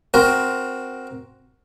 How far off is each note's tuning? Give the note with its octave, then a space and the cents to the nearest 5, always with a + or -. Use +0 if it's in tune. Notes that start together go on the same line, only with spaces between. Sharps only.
C4 +0 F#4 +0 A#4 +10